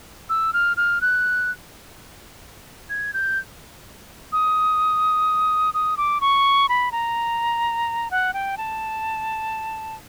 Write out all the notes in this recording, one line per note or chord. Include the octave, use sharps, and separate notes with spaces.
E6
F6
F6
F#6
G#6
G6
D#6
D#6
D6
C#6
B5
A#5
F#5
G5
A5